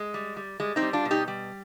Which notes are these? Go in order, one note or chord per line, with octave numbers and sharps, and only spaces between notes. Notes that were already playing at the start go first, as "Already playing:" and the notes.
Already playing: G#3
G3
G3
G3 G#3
C4 D#4
G3
D4 F4
B2
D#4 G4
G3